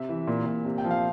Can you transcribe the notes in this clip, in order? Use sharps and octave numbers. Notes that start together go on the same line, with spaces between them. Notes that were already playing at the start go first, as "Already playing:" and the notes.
Already playing: C3 E5
E3
A#2
A#2
C3
G5
F3
F5